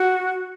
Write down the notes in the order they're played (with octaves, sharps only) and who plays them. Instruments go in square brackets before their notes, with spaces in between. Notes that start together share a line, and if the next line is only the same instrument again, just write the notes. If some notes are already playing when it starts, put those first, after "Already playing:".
Already playing: [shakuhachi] F#4